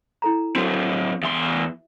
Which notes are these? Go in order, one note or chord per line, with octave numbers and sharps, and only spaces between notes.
E4 A4 A#5
F#3 C4 F#4
E2 E5 C6